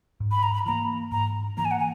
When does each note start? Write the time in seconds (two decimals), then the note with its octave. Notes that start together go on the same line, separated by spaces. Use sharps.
0.20 G#2
0.31 B5
0.43 A#5
0.54 B5
0.66 E3 A#3 A#5
1.12 G#2 A#5
1.57 E3 A#3 A#5
1.65 G#5
1.71 F#5
1.79 G#5